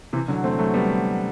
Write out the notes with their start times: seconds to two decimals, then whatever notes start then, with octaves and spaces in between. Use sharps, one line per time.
0.13 C3 E3
0.28 D3 F#3
0.44 A3 C4
0.58 F#3 A3
0.74 G3 B3